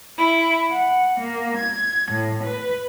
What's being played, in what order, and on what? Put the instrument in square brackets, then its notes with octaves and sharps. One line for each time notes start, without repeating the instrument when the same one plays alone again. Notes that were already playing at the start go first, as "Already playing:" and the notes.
[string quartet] E4
F#5
A#3
G#6
A2
B4